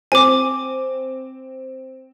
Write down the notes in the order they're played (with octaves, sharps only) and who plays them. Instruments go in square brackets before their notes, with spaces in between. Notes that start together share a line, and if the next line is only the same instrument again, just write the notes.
[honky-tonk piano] C4 [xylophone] G#5 D6